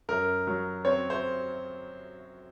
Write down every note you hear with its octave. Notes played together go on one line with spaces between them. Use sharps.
F#2 A#4
F#3
C4 C#5
C5